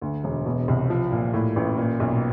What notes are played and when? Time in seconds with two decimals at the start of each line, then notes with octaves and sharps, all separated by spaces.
0.02 D2
0.24 E1
0.46 B2
0.68 C2
0.90 F3
1.12 A#2
1.33 A2
1.56 A1
1.77 A#2
2.00 B1